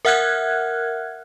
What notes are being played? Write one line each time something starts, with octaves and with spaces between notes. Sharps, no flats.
A#4 E5 F#5 F6 F#6 G#6